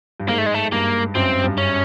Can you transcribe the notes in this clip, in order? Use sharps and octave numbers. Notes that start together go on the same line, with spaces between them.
G2
G#2 A#3
A3
G#3
A3
G2 A#3
F#2 C4
G2
C#4